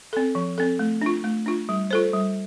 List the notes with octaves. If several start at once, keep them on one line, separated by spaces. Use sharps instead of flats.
C4 A4
F3
C4 A4
A3
D4 F4
A3
D4 F4
G3
F4 A4 C5
G3